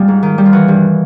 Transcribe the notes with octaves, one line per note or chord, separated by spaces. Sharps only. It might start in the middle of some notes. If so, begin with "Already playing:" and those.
Already playing: G3 G#3 D#4 F4
G#2
D#3
G3
F4
E3 F#4
G2